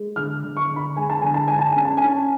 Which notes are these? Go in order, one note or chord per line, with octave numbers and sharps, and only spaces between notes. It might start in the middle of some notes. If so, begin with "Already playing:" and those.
Already playing: G#3
D3 F6
D3
C#6
D3
B5
G#3 G#5
A5
D3 G#5
A5
G#3 G#5
A5
C#4 G#5
A5
G#5
C#4